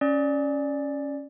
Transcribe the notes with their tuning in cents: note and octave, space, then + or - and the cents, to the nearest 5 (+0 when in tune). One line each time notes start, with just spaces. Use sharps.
C#4 +0 D5 +5